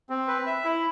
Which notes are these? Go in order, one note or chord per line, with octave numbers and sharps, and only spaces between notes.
C4
B4
E5
E4